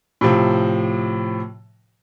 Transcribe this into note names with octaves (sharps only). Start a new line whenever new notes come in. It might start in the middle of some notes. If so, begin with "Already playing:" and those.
A2 C3 F3